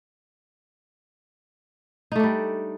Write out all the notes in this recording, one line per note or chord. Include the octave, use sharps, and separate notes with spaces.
G3 A3 D4 D#4